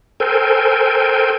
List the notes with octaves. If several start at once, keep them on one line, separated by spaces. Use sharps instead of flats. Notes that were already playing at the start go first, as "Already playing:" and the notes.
A4 A#4 C5 G5 G#5